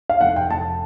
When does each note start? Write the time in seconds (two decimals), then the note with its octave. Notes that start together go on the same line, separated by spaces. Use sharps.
0.09 F5
0.21 F1 F#5
0.36 G5
0.50 F1 A5